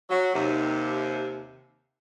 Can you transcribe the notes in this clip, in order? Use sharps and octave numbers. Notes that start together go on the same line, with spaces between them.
F#3
D#2 C3